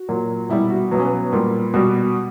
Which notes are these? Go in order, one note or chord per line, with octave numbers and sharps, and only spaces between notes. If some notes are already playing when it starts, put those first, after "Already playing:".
Already playing: F#4
A#2 F#3
B2 G3 E4
F#4
B2 F#3 B3
C#4
B3
A#2 G3
B2 G3 F#4